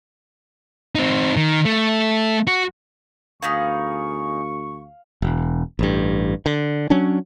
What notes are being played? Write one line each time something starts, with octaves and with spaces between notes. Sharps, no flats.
C4 D#4
D#3
A3
F#4
D2 B3 D#4 G#4 F5 C#6
E1
A1 G2
D3
F#3 C#4 D4